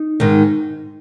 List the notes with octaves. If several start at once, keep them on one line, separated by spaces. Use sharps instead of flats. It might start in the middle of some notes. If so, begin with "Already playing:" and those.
Already playing: D#4
G#2 D#3